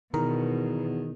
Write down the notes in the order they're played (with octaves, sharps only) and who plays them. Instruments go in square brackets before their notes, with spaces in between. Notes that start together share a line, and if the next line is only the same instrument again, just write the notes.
[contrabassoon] E2 [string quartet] B2 [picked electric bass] D#3 [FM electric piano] A#4